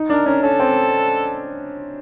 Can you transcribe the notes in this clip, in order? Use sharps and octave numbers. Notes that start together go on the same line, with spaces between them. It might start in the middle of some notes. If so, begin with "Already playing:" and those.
Already playing: D#4
D4 A#4
C#4 A#4
C#4 A4
C4